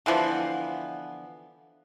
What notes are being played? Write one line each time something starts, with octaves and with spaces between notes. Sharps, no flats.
D3 E3 F3 B3